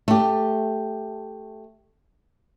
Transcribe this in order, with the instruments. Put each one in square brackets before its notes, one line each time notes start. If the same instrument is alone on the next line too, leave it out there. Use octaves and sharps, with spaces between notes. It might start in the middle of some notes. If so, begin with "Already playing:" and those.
[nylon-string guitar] A3 G4